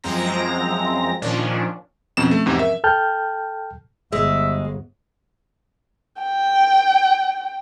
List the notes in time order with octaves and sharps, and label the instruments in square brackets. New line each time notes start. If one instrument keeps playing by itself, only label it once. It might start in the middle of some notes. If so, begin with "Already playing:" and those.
[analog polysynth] F#2 F3 G#3 C4 A#5 A#6
A#2 D#3 F3 C#4 D4
[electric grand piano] F2 B2 E7 [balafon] F3 C4 C#4
[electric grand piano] A3
E2 G#2 C3
[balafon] A#4 [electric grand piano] E5
[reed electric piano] A4 G5 A5 F6 G6
[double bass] G1 [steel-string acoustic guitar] G#3 [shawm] E5
[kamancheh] G5